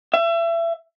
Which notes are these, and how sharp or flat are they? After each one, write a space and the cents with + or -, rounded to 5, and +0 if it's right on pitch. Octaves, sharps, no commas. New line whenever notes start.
E5 +30